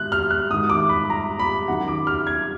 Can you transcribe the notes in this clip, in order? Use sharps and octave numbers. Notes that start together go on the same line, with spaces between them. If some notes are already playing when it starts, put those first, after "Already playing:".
Already playing: G#2 D#3 F#6
F6
F#6
G#2 D#3 D#6
D6
B5
A#5
B5
F#2 D#3 F#5
D6
F6
G#6